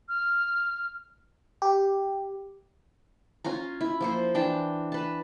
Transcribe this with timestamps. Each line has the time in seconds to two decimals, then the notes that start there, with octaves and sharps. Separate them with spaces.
0.09 F6
1.62 G4
3.44 C#4 F4 G#5 A#5
3.81 E4
4.01 F3 A#3 C5
4.35 E3 D4 G5 A5
4.92 B4 A5